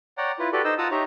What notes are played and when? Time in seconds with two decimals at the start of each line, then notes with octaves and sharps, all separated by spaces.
0.18 C#5 D5 F#5 G5 A#5
0.39 E4 F4 B4
0.53 F#4 G4 A4 B4 D5
0.65 D#4 C5 D#5 E6
0.78 F4 F#5 A5 A#5 D#6 E6
0.91 D#4 G4 C#5 E5 A#5